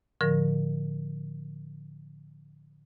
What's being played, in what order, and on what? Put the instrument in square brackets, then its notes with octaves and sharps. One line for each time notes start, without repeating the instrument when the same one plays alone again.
[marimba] A2 D3 F3 A#4 A#6